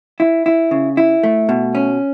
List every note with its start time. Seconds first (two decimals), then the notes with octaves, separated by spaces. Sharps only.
0.20 E4
0.46 E4
0.71 C#3
0.97 E4
1.23 A3
1.49 B2
1.75 C#4